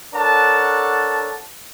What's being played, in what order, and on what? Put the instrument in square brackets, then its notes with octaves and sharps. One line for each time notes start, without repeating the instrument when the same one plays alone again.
[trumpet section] D4 A4 A#4 C#5 F#5 A5